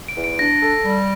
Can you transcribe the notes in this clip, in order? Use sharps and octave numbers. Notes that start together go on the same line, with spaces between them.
D7
E2
D7
D4 A#6
A4
G3